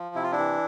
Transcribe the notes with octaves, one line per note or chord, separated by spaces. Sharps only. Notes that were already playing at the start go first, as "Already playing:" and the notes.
Already playing: F3
C3 E4
F4
D4 E4
E3